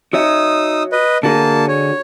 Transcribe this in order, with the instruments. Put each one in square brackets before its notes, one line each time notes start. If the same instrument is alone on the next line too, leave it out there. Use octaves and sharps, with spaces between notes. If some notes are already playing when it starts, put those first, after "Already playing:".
[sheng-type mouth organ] D#4 D#6 E6 [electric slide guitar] F#4 C#5 E5
[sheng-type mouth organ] B4 D#5
[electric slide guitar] D3 F#4 G#4 [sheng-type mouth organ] A#3 A5
[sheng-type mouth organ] C#5